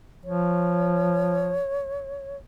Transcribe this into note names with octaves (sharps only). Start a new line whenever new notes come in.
F3 C#5